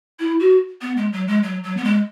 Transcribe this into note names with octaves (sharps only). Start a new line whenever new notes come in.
E4
F#4
B3
G#3
F#3
G#3
F#3
F#3
B3
G#3